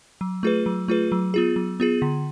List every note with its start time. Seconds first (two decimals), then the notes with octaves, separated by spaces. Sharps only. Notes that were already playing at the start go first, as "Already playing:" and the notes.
0.21 F#3
0.43 A3 F4 G#4 B4
0.66 F#3
0.88 A3 F4 G#4 B4
1.12 F#3
1.34 B3 F4 G#4
1.56 F#3
1.80 B3 F4 G#4
2.02 D3